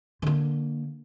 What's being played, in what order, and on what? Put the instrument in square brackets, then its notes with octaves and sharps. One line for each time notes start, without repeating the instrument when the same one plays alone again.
[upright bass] D3 A#3